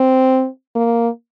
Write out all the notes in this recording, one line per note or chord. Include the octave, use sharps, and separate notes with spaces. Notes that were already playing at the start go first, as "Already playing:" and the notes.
Already playing: C4
A#3